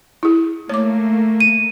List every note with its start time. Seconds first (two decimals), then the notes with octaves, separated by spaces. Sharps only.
0.23 E4 G#4
0.69 A3 A#3 C#5 D6
1.40 D#7